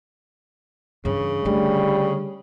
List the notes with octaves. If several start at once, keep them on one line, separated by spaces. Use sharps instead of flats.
G2 C#3 E3
D3 G3 A3